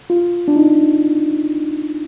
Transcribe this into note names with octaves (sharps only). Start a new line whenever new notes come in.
F4
D4
D#4